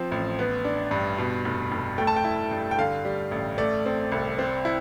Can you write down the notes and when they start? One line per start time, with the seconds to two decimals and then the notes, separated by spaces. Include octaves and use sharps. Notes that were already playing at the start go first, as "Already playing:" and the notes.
Already playing: F3 C4
0.11 A1
0.39 B3
0.65 D4
0.91 G2
1.18 B2
1.45 F1
1.72 F1
1.98 A3 G5
2.07 A5
2.16 G5
2.25 E4
2.51 G2
2.71 G5
2.78 D3 F5
3.05 G3
3.31 A1
3.58 A3 D5
3.86 C4
4.12 C2
4.39 C4
4.65 E4